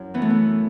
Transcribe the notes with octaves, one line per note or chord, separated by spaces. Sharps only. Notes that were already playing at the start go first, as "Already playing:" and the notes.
Already playing: F#2 E4
E3 B3
A3
B3